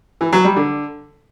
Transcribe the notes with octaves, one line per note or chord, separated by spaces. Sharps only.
E3
F#3
G3
D3